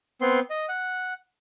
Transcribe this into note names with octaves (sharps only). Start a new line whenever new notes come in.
B3 C4 C6
D#5
F#5